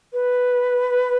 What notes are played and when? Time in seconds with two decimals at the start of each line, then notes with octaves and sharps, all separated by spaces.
0.13 B4